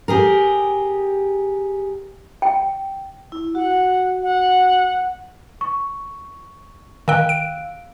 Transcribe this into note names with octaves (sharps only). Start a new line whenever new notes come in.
G4 G#4 A#4
G5
E4
F#4 F#5
F#5
C#6
D#3 F5 G5 E6 F#6
D7